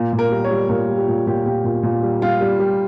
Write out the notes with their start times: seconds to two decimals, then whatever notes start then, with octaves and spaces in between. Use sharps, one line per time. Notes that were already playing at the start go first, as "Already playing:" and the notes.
Already playing: A#2
0.13 A#2
0.19 A#4
0.31 G3
0.44 C#5
0.51 G3
0.69 A#2 A#4
0.89 G3
0.98 G4
1.08 A#2 F4
1.27 A#2 G4
1.46 A#2 G4
1.64 A#2
1.83 A#2
2.03 G3
2.22 G3 F4
2.41 G3
2.60 G3